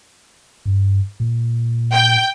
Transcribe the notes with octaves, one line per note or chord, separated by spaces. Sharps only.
G2
A#2
G5